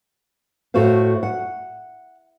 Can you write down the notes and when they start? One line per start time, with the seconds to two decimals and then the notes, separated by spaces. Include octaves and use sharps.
0.74 A2 F#4 A4 C5 F5
1.23 F#5